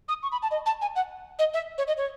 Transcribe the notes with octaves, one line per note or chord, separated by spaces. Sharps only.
D#6
C#6
B5
A5
D#5
A5
G#5
F#5
D#5
E5
C#5
D#5
C#5